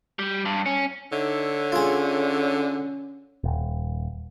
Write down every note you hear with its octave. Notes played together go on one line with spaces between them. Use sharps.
G3
G2
C#4
D3 D#4 C#5 E5
C#4 F4 G#4
D#1